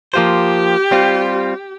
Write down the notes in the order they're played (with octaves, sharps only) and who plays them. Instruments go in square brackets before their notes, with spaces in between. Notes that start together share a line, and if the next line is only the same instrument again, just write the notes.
[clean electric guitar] F3 A#3 F4 C5 [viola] G4
[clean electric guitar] G3 C4 F4